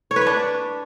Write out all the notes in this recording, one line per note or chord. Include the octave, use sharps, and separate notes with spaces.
C#5
B4
C#5
D4